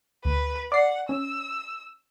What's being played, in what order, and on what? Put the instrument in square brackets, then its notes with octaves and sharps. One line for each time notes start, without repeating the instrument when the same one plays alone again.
[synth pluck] D2 [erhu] B4
[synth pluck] D5 C7 [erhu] F#5
[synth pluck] C#4 [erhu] E6